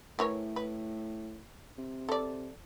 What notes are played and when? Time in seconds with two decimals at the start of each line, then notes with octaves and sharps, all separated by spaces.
0.19 A2 E3 A#4 C#5
0.56 B4
1.78 C3
2.09 A4 D5